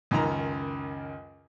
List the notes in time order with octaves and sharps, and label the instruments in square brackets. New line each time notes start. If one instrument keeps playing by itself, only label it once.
[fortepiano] C#2 F#2 D#3 A#5